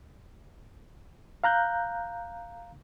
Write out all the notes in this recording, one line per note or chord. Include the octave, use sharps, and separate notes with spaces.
F5 A#5 F#6 G6